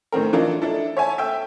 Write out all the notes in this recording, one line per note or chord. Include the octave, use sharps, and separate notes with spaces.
A2 D#3 C4 A#4
E3 D4 F4 A4 A#4 D#5
D4 E4 A4
C#5 E5 G#5 A5
E5 G5 E6